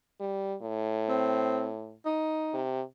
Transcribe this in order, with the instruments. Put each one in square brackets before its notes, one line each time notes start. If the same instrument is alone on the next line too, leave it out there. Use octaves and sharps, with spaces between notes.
[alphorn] G3
A2
[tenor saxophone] C4
D#4
[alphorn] C3